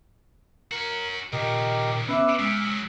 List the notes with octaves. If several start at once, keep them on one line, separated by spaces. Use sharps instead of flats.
C#4 F#4 A#4
D#2 A#2 C#3 G4 A#4 D#5
B3 C#4 B4 E5 D6 E6 F#6
A#2 G#3 D#6 E6 B6
C#3 F#3